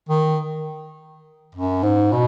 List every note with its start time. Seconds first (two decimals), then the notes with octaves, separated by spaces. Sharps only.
0.09 D#3
1.55 F#2
1.83 G#2
2.12 B2